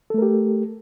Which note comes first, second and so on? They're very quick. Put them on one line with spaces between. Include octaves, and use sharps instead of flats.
A4 A3 A#4 G4